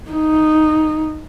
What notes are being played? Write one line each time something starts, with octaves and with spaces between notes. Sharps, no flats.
D#4